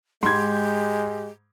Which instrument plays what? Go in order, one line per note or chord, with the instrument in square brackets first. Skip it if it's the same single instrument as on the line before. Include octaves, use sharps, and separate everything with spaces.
[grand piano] G#2 B5 [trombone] G#3 [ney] G4 [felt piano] C6 G#6